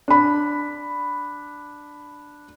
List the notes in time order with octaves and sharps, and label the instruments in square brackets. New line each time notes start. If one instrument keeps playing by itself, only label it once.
[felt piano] D4 B5